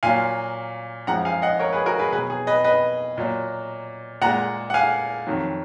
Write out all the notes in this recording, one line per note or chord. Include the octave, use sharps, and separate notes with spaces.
A#2 F#3 F5 G#5
F#2 F3 G#3 F#5 A#5
F5 G#5
D#5 F#5
A#4 C#5
G#4 B4
F#4 A#4
G#4 B4
B2 F#3 G#4 B4
G#4
B4 D#5
B4 D#5
A#2 F#3
A#2 G#3 F#5 A#5
F#5
F5 G#5
F2 D#3 F#3